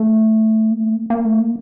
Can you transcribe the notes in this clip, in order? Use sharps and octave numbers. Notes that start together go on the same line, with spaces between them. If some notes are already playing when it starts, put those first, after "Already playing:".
Already playing: A3
A#3
A3
A#3
A#3
A3
A#3